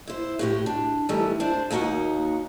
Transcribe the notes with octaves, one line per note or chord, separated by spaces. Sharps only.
E4 C5
A2 F#4 G4
D4
D#3 E3 G3 A3
D4 C5 D5
D#2 A#3 D#4 F#4 F#5